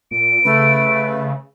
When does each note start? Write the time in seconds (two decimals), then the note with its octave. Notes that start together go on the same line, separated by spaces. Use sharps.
0.11 A#2 D7
0.45 C#3 A3 B4